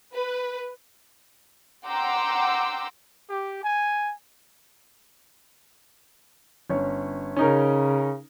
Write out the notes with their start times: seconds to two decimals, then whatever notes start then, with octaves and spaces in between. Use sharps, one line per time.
0.15 B4
1.86 F#5 G5 A#5 C6 D6 E6
3.29 G4
3.62 G#5
6.70 G1 C#4 C#5
7.37 C#3 C#4 D#4 A#4